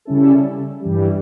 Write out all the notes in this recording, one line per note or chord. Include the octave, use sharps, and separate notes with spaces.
C#3 G3 C#4 E4 A4
G2 E3 G3